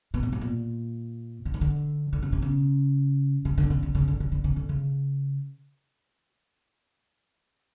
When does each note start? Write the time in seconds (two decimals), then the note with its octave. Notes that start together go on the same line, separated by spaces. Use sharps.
0.14 B2
0.23 A#2
0.32 A2
0.41 A#2
1.45 D3
1.54 D#3
1.61 D3
2.13 D3
2.22 C#3
2.32 C3
2.42 C#3
3.45 C#3
3.58 D3
3.70 C#3
3.83 D3
3.95 C#3
4.08 D3
4.20 C#3
4.32 D3
4.44 C#3
4.56 D3
4.69 C#3